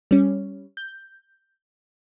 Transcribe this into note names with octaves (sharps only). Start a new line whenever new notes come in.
G3 C#4
G6